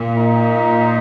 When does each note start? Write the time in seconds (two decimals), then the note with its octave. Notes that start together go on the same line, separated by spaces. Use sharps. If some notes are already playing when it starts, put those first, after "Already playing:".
Already playing: A#2
0.17 D#4